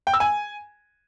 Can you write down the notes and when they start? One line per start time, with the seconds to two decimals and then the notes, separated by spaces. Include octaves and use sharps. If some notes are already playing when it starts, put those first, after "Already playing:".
0.07 G5
0.14 E6
0.20 G#5